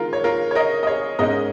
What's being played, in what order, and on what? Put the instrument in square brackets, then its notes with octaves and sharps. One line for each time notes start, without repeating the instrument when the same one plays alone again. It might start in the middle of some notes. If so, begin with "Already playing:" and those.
Already playing: [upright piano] D#3 G#3 F4 A#4
C#5
F4 A#4
C#5
A#4 D#5
D#5
G#4 C#5
G#2 G#3 C#4 A#4 D#5